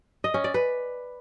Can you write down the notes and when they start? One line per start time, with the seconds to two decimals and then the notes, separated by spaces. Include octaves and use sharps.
0.24 D#5
0.34 C#4
0.44 D5
0.54 B4